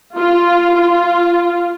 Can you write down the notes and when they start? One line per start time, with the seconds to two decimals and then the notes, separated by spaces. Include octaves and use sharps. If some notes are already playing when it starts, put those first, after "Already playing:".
0.15 F4
0.74 F4